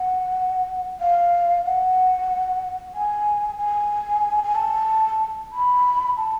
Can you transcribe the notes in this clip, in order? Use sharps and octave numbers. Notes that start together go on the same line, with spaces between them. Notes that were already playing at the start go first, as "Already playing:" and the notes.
Already playing: F#5
F5
F#5
G#5
G#5
G#5
A5
B5
A5